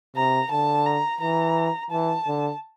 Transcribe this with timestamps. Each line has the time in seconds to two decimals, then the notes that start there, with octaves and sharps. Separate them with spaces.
0.16 C3 A#5
0.52 D3 A5
0.86 A#5
1.21 E3 A#5
1.91 E3 A5
2.27 D3